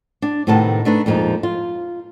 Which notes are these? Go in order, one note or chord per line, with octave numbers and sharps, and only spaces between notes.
D4
A2 C3 D#3 B3 A5
A3 D4 D#4 B4
F2 A#2 F3 G#3 D#4
F4